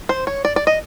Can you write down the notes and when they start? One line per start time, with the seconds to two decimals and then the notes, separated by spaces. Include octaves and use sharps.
0.09 C5
0.27 C#5
0.45 D5
0.56 D5
0.67 D#5